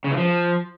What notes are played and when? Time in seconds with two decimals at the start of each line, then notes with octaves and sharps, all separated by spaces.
0.04 C#3
0.11 E3
0.18 F3